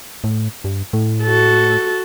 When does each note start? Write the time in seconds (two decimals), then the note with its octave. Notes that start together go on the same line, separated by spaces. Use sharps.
0.24 A2
0.64 G2
0.93 A2
1.23 F#4 A4